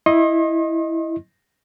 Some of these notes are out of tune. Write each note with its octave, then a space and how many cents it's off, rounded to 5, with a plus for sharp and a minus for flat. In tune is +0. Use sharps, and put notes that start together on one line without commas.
E4 +0 D#5 +0 C6 +45